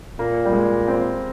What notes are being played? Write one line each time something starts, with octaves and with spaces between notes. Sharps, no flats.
A#2 A#3
G3
G#3
C4